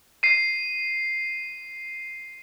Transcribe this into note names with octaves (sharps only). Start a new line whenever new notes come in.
C7 D#7